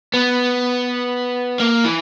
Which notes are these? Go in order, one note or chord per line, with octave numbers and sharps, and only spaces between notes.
B3
A#3
E3